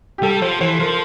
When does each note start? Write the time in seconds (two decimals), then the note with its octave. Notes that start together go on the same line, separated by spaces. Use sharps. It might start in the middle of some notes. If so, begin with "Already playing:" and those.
0.18 G4
0.23 G3 A4
0.41 F3 C5
0.60 E3 C5
0.79 F3 A#4